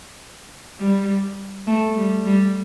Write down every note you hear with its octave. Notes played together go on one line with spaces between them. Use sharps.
G3
A3
G3
G3